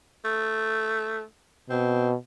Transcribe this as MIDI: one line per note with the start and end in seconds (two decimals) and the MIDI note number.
0.25 1.21 57
1.70 2.15 47
1.70 2.09 60